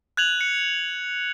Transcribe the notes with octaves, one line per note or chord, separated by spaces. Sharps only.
F#6 G#6 F7 F#7
C#7